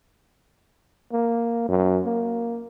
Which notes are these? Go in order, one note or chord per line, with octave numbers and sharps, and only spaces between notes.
A#3
F#2
A#3